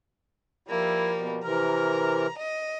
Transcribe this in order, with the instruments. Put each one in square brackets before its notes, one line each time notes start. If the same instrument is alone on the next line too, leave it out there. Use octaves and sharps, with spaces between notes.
[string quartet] F3 G3 A#3 [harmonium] E4
[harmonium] B2
[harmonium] C3 E3 A#4 [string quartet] A#5
[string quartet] D#5